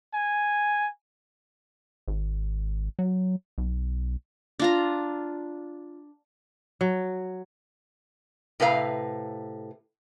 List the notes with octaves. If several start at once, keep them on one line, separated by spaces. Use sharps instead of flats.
G#5
G#1
F#3
B1
D4 F4 A#5
F#3
A2 C3 B4 F5 A#5